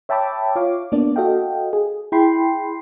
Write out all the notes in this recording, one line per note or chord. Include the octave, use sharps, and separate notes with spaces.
C#5 E5 G5 A5 B5 D6
F4 C#5 F5 D6
A#3 B3 D4 D5
F#4 A4 D#5 F5 G5
G#4
E4 G#4 G5 B5 C6 C7